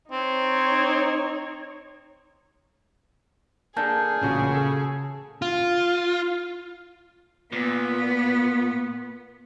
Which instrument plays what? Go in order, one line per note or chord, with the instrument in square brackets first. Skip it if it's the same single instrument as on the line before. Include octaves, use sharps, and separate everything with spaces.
[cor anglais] C4 [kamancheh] D#4 C#5
[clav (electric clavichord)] A#3 D4 A4 [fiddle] G#4 [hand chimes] A5 G6
[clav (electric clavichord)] A1 A#2 F#4 [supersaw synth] C#3
[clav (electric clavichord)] A4
[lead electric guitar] F4
[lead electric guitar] A#2 [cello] B3